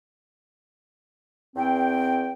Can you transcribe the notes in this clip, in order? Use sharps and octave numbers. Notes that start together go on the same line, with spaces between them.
E2 C4 G5